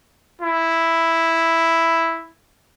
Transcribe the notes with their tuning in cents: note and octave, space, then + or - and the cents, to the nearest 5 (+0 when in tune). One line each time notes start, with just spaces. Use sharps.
E4 +0